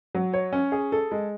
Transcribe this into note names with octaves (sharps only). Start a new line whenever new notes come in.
F#3
C#5
C#4
G#4
A4
G#3